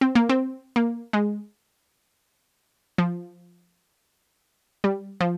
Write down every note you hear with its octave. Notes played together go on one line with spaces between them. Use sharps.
C4
A#3
C4
A#3
G#3
F3
G3
F3